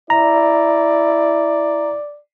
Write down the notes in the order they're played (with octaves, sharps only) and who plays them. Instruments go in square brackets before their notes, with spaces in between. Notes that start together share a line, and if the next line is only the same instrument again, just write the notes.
[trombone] E4 [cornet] D5 [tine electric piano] A#5